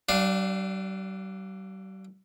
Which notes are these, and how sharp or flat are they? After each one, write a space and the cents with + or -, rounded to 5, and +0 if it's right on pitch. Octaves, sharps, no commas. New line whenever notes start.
G3 -45 D4 +0 F5 +0